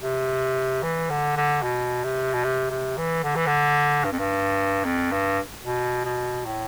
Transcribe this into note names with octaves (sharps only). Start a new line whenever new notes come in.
C3
E3
D3
D3
B2
C3
B2
C3
C3
E3
D3
E3
D3
G2
F2
G2
F2
G2
B2
B2
A2